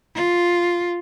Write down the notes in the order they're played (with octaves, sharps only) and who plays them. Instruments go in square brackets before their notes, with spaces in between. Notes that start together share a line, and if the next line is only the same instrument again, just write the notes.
[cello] F4